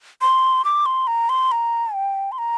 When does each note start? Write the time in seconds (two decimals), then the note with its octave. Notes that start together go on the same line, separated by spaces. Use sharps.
0.21 C6
0.65 D6
0.86 C6
1.07 A#5
1.29 C6
1.52 A#5
1.94 G5
2.32 C6
2.38 A#5